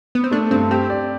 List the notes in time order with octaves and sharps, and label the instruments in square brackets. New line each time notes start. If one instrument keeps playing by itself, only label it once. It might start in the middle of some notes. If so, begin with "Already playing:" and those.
[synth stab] B3
C4
[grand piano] A3 [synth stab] D4
[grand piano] G2 [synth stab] C4
[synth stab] C4 [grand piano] G4
[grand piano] D5